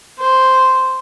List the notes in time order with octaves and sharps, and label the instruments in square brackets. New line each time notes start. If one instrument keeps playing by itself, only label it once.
[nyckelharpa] C5